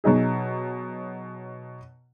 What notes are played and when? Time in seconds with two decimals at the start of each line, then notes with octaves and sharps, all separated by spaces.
0.04 B2 F#3 D#4 G#4